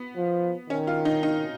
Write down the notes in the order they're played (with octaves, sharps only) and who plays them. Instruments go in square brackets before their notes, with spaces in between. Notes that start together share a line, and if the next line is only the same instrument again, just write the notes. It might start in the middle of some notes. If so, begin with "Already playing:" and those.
Already playing: [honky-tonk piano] B3
[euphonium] F3
[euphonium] D#3 [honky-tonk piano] C#4
[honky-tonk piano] F4
D#4
D#4